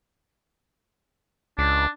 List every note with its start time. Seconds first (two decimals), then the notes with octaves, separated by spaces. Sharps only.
1.58 C#2 D4